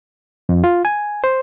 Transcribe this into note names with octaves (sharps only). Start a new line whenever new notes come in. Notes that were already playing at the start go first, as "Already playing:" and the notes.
F2
F4
G#5
C5